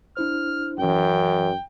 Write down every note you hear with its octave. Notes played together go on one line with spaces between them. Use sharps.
D4 E4 C5 F6
F#2 E3 C#4 G5